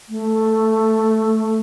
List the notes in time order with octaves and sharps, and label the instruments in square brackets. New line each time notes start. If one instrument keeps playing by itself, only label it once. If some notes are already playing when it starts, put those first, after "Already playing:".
[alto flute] A3